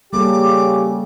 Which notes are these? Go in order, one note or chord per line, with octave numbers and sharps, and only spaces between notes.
C#3 G3 A#3 G4 A4 D6